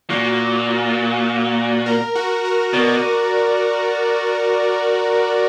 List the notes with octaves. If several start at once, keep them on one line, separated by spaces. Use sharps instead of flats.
A#2 F#4
A#4
F#4
A#4
B2 D5